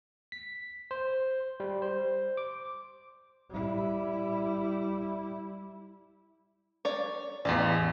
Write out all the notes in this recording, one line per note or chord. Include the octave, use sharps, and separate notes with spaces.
B6
C5
G3
C5
D6
G3 E4
C#5 D5
A1 E2 F4 G4 D5